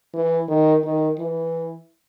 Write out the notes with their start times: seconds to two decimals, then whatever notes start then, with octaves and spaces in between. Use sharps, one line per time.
0.14 E3
0.48 D#3
0.83 D#3
1.19 E3